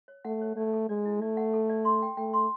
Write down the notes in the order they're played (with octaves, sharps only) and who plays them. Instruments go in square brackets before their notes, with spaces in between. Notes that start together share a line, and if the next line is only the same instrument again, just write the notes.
[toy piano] C#5
[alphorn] A3 [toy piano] F#5
[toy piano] C#5
[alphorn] A3 [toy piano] D5
[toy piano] A4
[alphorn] G#3 [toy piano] D5
[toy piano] E4
[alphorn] A3 [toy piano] D5
[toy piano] F#5
A4
D5
C6
G5
[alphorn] A3 [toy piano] G5
[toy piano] C6